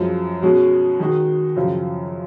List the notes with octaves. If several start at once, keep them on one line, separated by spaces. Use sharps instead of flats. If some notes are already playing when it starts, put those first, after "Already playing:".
Already playing: F#2 F3 G#3
B2 G#3 C#4 F#4
D#3 G#3 D#4 F#4
F#2 C#3 F3